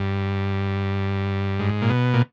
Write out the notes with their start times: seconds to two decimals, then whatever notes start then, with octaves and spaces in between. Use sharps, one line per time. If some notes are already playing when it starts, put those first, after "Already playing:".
Already playing: G2
1.59 G#2
1.82 A#2
1.90 B2
2.14 A#2